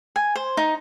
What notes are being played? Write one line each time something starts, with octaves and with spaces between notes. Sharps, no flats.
G#5
C5
D#4